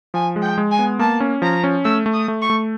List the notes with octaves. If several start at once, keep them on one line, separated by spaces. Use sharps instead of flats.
F3 G#5
G#3
G5
G#3
G#5
B3
A#3 A5
C#4
F3 A#5
C#4
A3 E6
A3
D#6
A3
C#6
A3